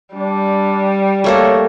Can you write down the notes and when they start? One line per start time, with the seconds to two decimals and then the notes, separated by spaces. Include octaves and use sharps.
0.15 G3 D4
1.24 A3 A#3 A4 C#5